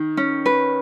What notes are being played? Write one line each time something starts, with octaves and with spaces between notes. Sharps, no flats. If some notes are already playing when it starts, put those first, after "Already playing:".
Already playing: D#3
C#4
B4